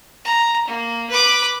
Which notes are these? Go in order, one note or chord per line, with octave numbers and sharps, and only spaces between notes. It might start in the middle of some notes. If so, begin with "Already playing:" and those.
A#5
A#3
B4 D6